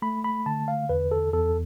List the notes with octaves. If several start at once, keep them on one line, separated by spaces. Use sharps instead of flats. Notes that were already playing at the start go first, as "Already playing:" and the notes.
A3 B5
B5
D3 A5
F5
E2 B4
A4
E2 A4